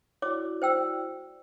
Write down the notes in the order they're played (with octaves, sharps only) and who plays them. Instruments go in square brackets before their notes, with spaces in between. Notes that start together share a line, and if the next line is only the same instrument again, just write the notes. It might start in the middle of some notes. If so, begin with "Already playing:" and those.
[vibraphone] E4 F#4 D5 [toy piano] C#5 D6
[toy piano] C5 G5 E6